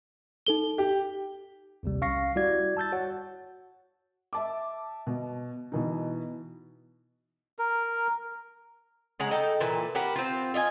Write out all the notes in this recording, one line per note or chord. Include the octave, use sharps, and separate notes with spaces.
D#4 A4 G7
G4
A#1 D#2 C3 G3
C2 C#4 F5 C#6 A#6 C7
G3 E4 F#4 D5 G#6
A5 E6 G6 A6
F#4 C#5 F#5
E5 A5 D6
B2
B2 E3 D#4
A#4
C#3 G#3 F#5 A#5
D#4 A4 G5
A#2 E3
F#4 G4 A#4 B4
C4 F4
F4 D#5 E5 G#5